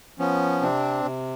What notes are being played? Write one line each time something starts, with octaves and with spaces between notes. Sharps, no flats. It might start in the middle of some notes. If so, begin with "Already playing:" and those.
F3 B3 C#4
C3 C4 D4
C3